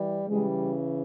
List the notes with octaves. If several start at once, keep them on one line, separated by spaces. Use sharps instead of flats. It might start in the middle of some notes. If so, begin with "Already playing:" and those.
Already playing: E3 G3
C#3 E3 G3 G#3